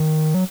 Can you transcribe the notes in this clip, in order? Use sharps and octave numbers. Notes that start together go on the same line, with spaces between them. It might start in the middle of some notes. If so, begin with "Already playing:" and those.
Already playing: D#3
F#3